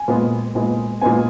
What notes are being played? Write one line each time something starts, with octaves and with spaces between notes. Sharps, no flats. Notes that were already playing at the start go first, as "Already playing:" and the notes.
Already playing: G#5
A#2 G#3 B3
A#2 G#3 B3
A#2 G#3 B3 G#5